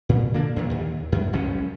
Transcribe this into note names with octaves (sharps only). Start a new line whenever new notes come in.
A#2
D3 A#3 D4
E2 A#2
D#2
F#2
F#1 C#2 F#3 C#4